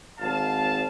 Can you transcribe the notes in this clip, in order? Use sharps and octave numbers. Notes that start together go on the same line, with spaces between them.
G#1 F5 A5